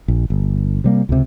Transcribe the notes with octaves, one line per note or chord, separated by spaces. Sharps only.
A#1
G1
C3 G3 A#3
C#2 C3